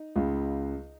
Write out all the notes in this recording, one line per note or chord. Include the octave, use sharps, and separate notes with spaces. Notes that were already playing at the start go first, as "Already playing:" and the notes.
Already playing: D#4
C#2 C#3